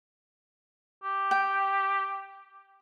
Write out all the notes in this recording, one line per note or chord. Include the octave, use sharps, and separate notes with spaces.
G4
G5